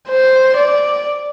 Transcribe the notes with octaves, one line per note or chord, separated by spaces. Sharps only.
C5
D5